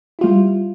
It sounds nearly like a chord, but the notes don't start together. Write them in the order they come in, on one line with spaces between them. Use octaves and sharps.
E4 F4 G3